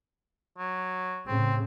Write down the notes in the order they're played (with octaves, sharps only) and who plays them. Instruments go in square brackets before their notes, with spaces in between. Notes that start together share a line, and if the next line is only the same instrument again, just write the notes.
[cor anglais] F#3
[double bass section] A2 C#3 [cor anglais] C4